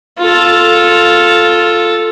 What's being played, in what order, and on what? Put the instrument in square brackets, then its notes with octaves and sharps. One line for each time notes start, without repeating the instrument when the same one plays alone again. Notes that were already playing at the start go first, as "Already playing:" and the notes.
[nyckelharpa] F4 A4